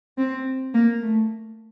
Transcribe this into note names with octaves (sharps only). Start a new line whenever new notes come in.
C4
A#3
A3